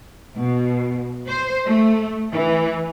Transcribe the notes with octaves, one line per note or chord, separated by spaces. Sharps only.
B2
C5
A3
E3